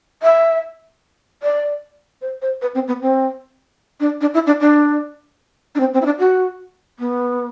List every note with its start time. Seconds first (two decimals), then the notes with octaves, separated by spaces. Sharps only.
0.23 E5
1.43 D5
2.22 C5
2.42 C5
2.62 B4
2.74 C4
2.88 B3
3.02 C4
4.00 D4
4.21 D4
4.34 E4
4.47 D4
4.60 D4
5.75 D4
5.80 C4
5.93 C4
6.02 E4
6.06 D4
6.19 F#4
6.99 B3